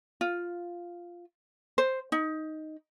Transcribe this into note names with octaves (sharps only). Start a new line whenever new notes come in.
F4
C5
D#4